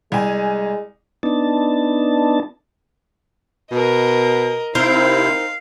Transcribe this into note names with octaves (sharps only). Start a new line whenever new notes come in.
C2 G#3 G#5
B3 D4 D#4 A5
B2 A#4 D#5
C3 C4 D#4 E4 A#4 C5 F5